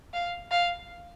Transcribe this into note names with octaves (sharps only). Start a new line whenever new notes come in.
F5
F5